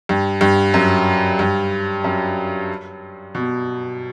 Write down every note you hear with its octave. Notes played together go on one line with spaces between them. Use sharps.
G2
G2
F#2
G2
F#2
B2